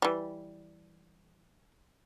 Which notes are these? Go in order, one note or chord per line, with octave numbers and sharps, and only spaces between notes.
E3 G3